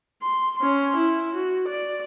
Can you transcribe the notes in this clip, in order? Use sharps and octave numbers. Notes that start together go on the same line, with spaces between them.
C6
C#4 C6
E4
F#4
D5